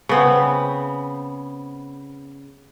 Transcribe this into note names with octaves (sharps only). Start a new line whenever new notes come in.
C#3 B3 C4